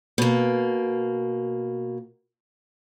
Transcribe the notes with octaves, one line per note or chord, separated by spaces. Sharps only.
B2 A#3